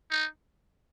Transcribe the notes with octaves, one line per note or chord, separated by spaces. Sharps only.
D#4